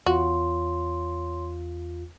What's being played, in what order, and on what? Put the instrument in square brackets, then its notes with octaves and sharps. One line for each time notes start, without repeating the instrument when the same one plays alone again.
[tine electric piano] E2 F4 [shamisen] F#4 [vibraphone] C#5 C6